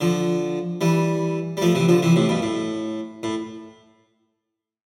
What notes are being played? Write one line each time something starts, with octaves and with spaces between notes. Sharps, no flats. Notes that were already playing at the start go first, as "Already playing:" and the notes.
D3 F3
E3 G3
G3
F3 A3
C3 E3
D3 F3
C3 E3
A2 C3
G2 B2
A2
A2